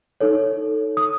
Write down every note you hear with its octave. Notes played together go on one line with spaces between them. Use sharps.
D#4 A4 C#5
D#6